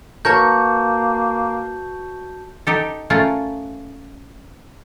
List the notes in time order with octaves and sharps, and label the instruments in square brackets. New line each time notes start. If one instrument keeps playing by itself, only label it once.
[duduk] A#3 [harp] F#4 B4 [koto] A#4 C#5 [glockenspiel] A5 G6
[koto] D#4 G4 A4
A3 C#4 F4 A#4